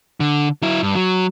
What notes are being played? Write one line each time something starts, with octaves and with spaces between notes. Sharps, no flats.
D3
F#3 E4
G2
F#3